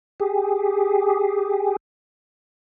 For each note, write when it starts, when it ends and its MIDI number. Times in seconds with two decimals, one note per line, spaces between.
0.20 1.76 67
0.20 1.76 68